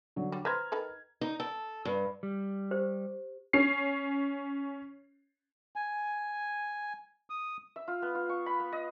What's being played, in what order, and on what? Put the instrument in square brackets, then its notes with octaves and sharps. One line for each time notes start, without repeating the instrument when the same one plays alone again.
[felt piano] D3 F#3
[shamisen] G3
[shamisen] B4 C5 [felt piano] A#5 F6 G#6
[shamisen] D#3 A4 B4
[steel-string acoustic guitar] D#4
A4
G2
[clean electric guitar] G3
[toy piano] G4 C5
[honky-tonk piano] C#4 C7
[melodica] G#5
D#6
[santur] E5
F4
B3
F4
C#6
B5
B3
D#5